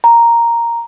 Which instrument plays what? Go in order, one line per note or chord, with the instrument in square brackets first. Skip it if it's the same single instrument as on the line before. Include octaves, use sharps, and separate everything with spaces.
[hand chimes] A#5